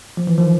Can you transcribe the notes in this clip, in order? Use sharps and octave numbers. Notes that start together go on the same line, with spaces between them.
F3
E3
D#3 F3